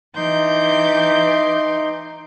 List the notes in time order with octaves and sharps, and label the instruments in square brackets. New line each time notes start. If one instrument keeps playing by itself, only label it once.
[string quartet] E3 D6 G6 [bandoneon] D#4 C6